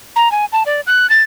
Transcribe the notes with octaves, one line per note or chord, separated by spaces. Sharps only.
A#5
G#5
A5
D5
F#6
A6